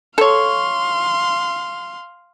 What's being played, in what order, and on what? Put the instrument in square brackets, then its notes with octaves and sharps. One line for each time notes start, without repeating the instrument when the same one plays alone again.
[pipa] A4 C#5 [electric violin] F5 C6